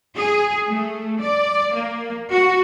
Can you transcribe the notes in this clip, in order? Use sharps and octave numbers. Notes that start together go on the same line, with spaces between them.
G#4
A3
D5
A#3
F#4